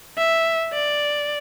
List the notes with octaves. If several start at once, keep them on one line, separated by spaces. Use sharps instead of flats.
E5
D5